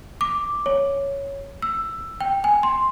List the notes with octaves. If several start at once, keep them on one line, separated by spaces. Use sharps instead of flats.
D6
C#5
E6
G5
G#5
C6